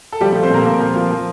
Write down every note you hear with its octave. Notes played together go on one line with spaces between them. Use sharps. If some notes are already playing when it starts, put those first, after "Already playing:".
A4
F3 G3 G4
A3 A4
F3
C4 C5
A#2 A#3 A#4
A#2 A#3 A#4
F3
F3
F3